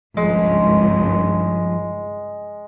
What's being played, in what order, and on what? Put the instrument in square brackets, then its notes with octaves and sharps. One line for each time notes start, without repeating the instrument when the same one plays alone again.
[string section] G#1 C#2 G2 [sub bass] F3 [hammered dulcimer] G#3